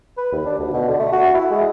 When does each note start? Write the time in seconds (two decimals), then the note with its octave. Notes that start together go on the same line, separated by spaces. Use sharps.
0.17 B4
0.32 D#2
0.46 D4
0.59 D2
0.73 B2
0.88 D3
0.99 A3
1.12 F#4
1.34 E4
1.51 G#3